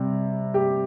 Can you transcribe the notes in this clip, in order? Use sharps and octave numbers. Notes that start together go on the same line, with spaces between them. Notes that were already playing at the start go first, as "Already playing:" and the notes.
Already playing: C3 G3
G4